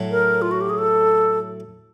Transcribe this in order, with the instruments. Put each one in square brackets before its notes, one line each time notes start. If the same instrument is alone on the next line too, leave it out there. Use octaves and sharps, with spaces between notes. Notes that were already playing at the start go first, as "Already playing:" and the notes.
Already playing: [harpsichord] A2 F#3 A3
[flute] A#4
F4
F#4
G4
G#4
A4